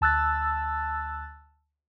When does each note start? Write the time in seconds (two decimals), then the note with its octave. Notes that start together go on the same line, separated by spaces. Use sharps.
0.01 D2 A5 E6 F#6 A6